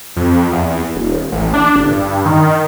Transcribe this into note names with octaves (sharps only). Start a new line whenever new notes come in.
F2
E2
D#1
A1
D4
G1
G2
D#3